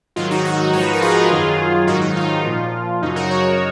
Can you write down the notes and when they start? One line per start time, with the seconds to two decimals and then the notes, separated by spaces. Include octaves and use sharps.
0.16 G#2 D#3 F#3 F4
0.31 D#4 F#4
0.45 D#4 F#4
0.73 G#2 F3 C#5
0.83 B4
0.93 A#4
1.02 F4 G#4
1.30 F#2 D#3 F#3
1.87 G#2 D#3 F#3 D#4 F#4
2.01 D#4
2.16 F4
2.44 A#2 F3
3.01 F#2 C#3 F#3 D#4
3.16 F#4 A#4
3.30 A#4 C#5